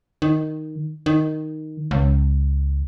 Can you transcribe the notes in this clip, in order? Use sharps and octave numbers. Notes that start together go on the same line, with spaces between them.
D#3
D#3
C#2